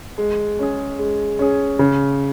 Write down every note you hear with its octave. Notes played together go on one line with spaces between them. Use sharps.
G#3
C#4 G#4
G#3
C#4 G#4
C#3